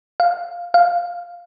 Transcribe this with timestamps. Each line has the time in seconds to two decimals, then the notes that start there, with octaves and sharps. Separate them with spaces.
0.20 F5
0.74 F5